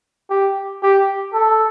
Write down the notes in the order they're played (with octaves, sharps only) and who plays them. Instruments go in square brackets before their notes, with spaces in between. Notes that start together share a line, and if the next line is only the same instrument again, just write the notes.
[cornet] G4
G4
A4